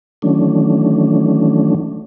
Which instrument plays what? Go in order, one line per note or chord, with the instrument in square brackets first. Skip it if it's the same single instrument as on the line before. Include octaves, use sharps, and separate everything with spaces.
[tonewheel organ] D#3 E3 F#3 A3 C#4 D4